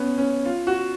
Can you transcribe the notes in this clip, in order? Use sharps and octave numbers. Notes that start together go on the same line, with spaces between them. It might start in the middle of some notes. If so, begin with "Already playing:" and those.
Already playing: B3 C#4
C#4
F4
F#4